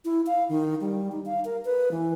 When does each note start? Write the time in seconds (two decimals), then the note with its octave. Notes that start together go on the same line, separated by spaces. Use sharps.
0.05 E4
0.26 F5
0.49 D#3
0.81 G3
1.12 D#4
1.25 F5
1.45 A#4
1.65 B4
1.91 E3